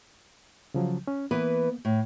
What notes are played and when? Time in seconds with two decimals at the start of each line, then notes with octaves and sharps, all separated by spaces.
0.74 C#3 F3 F#3
1.07 C#4
1.31 E3 A#3 B3 B4
1.85 A2